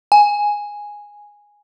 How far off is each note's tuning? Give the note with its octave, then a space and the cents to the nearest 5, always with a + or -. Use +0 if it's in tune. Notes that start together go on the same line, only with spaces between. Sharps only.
G#5 -5